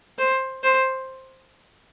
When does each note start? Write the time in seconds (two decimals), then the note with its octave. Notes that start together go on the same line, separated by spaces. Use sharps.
0.18 C5
0.63 C5